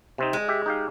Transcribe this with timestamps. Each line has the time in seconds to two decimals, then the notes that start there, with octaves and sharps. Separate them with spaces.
0.18 C3 C4 D#4
0.33 G#3
0.48 G4 E5
0.66 D#4 G4 F5